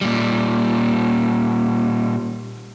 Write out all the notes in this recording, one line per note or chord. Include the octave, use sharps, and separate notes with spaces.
A#2 G3